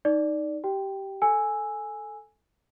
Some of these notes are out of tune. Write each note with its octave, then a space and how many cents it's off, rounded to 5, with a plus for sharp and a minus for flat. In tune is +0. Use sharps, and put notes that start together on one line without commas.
D#4 +0 D5 +0
G4 -15 G5 +0
A4 +0 G#5 +0 E6 +0